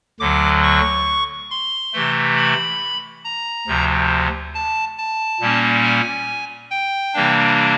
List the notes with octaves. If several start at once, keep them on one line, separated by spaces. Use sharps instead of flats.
D2 D3 F#3 D6
C#6
C6
C3 E3 A3
B5
A#5
D2 C3 F3
A5
A5
A#2 G3 A#3 C#4
G#5
G5
C3 E3 G3 A#3 D4